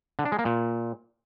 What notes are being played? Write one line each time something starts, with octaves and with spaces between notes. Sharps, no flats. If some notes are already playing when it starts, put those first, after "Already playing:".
D3
D4
G#3
A#3
A#2